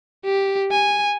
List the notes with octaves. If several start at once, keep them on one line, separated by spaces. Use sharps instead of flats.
G4
G#5